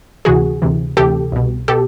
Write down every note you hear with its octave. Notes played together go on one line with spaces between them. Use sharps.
D2 C3 E3 F#4 G#4
D2 C3 E3
D2 C3 E3 G4 A4
C2 B2
B2 G4 A4